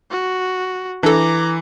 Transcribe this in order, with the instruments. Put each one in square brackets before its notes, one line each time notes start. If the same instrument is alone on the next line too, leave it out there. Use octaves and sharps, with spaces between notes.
[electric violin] F#4
[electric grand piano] E3 [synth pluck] D4 A4 [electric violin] A#5 D6